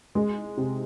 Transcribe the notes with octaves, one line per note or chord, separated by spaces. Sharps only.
G#3
C3